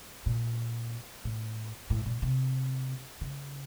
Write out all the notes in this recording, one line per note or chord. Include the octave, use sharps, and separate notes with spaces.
A#2
A2
A2
A#2
C3
C#3